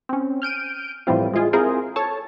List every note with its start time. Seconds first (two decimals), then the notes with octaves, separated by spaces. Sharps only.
0.09 C4 C#4
0.42 F6 G6 D7 D#7
1.07 A2 E3 F3 G3 C4 F4
1.33 G#3 E4 F4 G#4
1.53 C4 E4 F4 G#4 A#4 C5
1.96 A4 C#5 A5